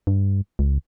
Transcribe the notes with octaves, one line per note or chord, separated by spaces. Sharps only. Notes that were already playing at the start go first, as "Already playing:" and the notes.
G2
C#2